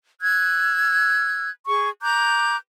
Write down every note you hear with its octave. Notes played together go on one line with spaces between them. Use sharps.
E6 F#6 G#6
G#4 C#6
A#5 D6 F#6 G6